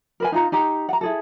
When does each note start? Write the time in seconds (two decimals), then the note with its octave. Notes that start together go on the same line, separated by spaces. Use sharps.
0.20 A#4 B4 G#5
0.32 D#4 F4 A#5
0.52 D#4 G4 A#5
0.89 F#5 A#5
1.01 E4 G#4 A4